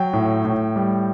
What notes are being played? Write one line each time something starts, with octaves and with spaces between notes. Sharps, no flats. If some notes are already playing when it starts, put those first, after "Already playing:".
Already playing: F#3 G5
A2
A2
G3